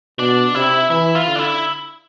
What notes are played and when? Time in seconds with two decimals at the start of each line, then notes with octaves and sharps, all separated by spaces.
0.18 B2 D4
0.54 C3 E4
0.90 E3 E4
1.15 F4
1.27 D3
1.36 D4
1.39 E4